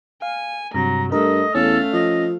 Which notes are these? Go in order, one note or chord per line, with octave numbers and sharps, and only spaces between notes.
F5 G#5
G2 C3 F#3 A#5
G2 A3 A#4 D#5
E2 A3 C#4 A4 F5
F3 D#5